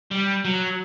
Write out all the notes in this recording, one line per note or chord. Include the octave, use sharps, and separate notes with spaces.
G3
F#3